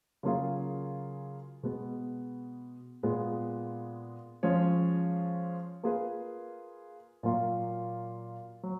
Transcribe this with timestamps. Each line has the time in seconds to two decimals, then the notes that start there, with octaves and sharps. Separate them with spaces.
0.23 C#3 F#3 A#3 F4 G#4
1.63 B2 G#3 B3
3.03 A#2 G#3 B3 F4
4.43 F3 G#3 C#4 G#4 C#5
5.83 A#3 F4 G#4 B4
7.23 A#2 F#3 A#3 F4
8.63 F#3